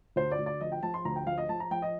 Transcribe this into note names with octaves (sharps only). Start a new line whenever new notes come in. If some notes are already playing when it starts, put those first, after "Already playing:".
D2 C5
D5
D2
D5
F3 D#5
G5
F3 A5
C6
D2 A#5
G5
F3 F5
D#5
F3 A5
A#5
F3 G5
D#5